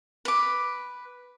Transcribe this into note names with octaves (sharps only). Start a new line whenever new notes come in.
B4 D6